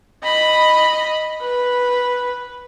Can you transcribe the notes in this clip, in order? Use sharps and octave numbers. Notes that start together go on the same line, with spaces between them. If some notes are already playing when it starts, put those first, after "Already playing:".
D#5 B5
B4